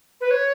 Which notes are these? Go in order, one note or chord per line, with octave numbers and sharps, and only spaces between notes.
B4
C#5